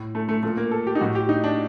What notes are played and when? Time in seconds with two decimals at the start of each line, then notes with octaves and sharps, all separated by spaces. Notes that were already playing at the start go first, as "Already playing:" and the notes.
Already playing: A2
0.15 A3
0.29 A3
0.43 A#2 A3
0.57 A#3
0.71 A4
0.87 G4
0.95 D#4
1.01 A2 F#4
1.15 G4
1.29 D#4
1.44 D4